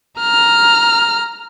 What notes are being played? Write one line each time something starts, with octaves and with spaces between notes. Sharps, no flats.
A#5 F6